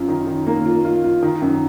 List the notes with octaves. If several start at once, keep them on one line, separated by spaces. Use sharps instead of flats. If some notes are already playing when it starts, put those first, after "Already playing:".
Already playing: F#2 F4
D#3
D#3
A#3
F4
F4
F4
D#3
F#2